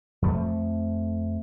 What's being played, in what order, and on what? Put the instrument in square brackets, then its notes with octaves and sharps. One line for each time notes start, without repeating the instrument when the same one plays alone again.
[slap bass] F2 F3 A3